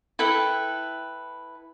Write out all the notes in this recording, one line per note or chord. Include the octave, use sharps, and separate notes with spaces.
E4 A4 B4 G5